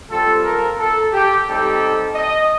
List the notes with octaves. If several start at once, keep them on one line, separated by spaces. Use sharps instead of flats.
G3 C4 F4 A4
A#4
A4
G4
G3 C4 D#4 G4 A4
D#5